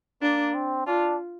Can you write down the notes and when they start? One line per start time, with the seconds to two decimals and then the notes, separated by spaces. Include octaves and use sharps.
0.22 A#3 D4
0.54 C4
0.87 D4 F4